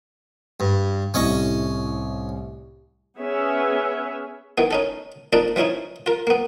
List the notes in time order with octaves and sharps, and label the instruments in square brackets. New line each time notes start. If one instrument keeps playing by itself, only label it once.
[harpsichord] G2
[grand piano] C2 A2 C3 [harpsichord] C#4 D#5 C#6
[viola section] B3 C#4 G#4 C#5 E5
[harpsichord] D#3 E3 B3
C#4 D#4 A4
F2 A#2 D4 D#4 D5
E3 F3 C#4 D#4 E4
F4 A#4
A#3 B3